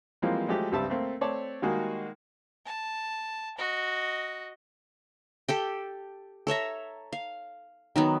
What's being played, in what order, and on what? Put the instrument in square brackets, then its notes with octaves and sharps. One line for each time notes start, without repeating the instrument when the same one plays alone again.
[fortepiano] E3 F3 G3 G#3 A#3 C4
F3 F#3 G#3 A3 G4
C#2 G2 G3 C4 E5 A5
A3 A#3 C4
A3 C4 C#5 D5 A5
D#3 G3 G#3 A#3 F#4 G#4
[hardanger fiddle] A5
F#4 D#5
[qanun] G4 A4 G5
A4 C#5 E5 A#5
F5
D#3 F#3 B3